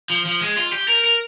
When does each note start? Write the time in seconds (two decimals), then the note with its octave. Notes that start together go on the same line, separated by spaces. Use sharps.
0.10 F3
0.26 F3
0.41 G#3
0.57 F4
0.73 G4
0.88 A#4
1.04 A#4